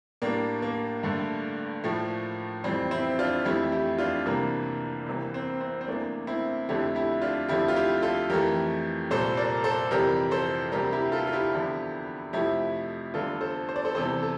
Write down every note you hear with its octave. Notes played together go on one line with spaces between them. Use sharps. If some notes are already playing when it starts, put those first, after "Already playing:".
A2 G3 A#3 D4
A#3
G2 D3 A3
A2 F3 A3
F2 E3 G3 C4
C4 E4
D4 F4
F2 E3 A3 E4 G4
E4 G4
D4 F4
C2 C3 E3 G3 A#3 D4
C2 C3 E3 A#3
C4
C4
C4
E2 E3 A3 A#3 D4
C4 E4
F2 D3 A3 E4 G4
E4 G4
D4 F4
F2 D3 F3 A3 E4 G4
F4
E4 G4
F4 A4
F2 E3 A3 G4 A#4
C2 A#2 G3 A4 C5
A#4 D5
A4 C5
F2 C3 E3 G3 G4 A#4
A4 C5
D2 C3 G3 G4 A#4
E4 G4
F4 A4
F4
E4 G4
E2 D3 F3
F2 C3 F3 A3 E4 G4
E2 D3 G3 F4 A4
A4 C5
C5
D5
A4 C5
E2 C3 E3 G3 A4 C5
A4